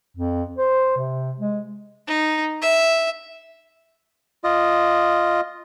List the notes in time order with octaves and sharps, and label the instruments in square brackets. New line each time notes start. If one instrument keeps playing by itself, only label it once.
[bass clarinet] F2
C5
C3
G#3
[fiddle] D#4
E5
[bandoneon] F4 D#5